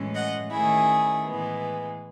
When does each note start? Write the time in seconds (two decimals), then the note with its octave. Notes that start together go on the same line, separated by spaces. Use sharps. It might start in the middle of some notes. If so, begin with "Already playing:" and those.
Already playing: A2 E3 G#3 C#4
0.15 D#5 F#5
0.52 D#3 A3 C#4 E4 G#4
1.26 A2 E3 G#3 B3